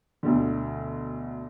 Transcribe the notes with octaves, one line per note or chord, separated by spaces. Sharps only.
D2 B2 D3